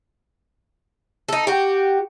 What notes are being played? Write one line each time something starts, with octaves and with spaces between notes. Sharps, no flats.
D#4 A4
F#4 G4